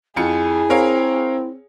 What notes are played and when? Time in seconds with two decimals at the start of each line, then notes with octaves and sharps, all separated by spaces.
0.16 F2 E4 F4 G#4 C#7
0.70 C4 A#4 C#5 F5